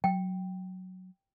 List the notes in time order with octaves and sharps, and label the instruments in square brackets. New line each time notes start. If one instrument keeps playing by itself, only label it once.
[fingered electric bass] F#3 [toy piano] G5